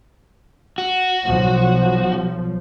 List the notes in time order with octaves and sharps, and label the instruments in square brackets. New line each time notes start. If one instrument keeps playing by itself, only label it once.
[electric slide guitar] F#4
[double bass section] B1 F3